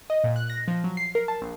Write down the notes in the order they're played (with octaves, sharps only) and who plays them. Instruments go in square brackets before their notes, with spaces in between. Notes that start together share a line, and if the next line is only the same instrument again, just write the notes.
[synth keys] D#5
A#2
F#6
A#6
F3
F#3
C7
A#4
A5
A#1